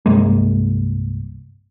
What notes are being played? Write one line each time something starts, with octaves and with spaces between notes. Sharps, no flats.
C2 G2 G#3 A#3